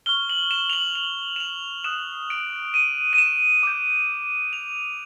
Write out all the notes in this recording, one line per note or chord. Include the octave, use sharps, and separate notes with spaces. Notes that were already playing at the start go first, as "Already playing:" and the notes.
C#6 F6 G7
F#7
E7
F7
F#7
F#7
E7
F7
D#6 F#6 E7
D7
D#7
D#7
E7
D6 G6
F7